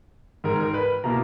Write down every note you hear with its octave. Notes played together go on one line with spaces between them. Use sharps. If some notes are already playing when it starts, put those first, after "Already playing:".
G#2 D#3 G#3 A#4
A#4
B4
B2 A#3 E4 A#5